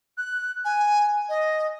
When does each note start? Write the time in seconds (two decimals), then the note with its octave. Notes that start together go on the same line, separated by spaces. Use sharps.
0.18 F#6
0.65 G#5
1.29 D#5